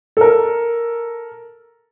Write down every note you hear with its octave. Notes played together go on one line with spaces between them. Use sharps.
A4 A#4